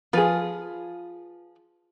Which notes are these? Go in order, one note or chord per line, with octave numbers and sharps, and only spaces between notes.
F3 F4 G#4 B4